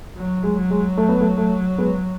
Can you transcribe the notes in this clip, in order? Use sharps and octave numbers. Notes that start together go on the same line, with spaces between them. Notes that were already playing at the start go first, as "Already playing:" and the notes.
F#3
G#3
F#3
G#3
A3
B3
A3
A3
G#3 B3